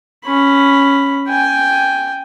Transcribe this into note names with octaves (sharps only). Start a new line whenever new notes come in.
C#4 B5
G5 G#5